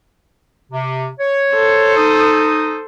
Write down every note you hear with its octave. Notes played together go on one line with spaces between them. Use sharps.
C3
C#5
A4 C5
D#4 D#6